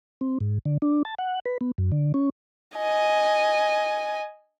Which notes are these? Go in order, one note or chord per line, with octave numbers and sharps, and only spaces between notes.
C4
G#2
D3
D4
A5
F#5
B4
B3
F#2
D3
C#4
D#5 G#5